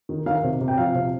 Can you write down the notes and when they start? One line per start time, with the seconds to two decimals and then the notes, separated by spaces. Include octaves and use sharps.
0.09 D#3
0.26 D#3 F5
0.44 C3
0.61 C3
0.68 G5
0.78 F3 F5
0.95 C3